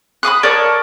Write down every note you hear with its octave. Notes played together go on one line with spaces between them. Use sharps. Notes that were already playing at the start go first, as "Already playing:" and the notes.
B5 D6 D#6 F#6
A4 A#4 C#5 D5